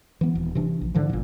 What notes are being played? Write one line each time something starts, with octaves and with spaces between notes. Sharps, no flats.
E3 B3
D#1
C3 E3 D4
A#1
G#2 D3 E3 F3
G1 A#2